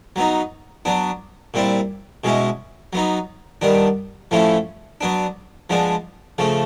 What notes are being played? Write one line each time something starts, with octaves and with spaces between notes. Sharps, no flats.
F#3 B3 D#4
F#3 B3 D4
A#2 G3 C4 E4
B2 G#3 C#4 E4
F#3 B3 D#4
D#3 G3 B3 D4
A2 F3 A3 C#4 E4
F#3 B3 D4
F3 G#3 B3 D4
C#3 F3 A3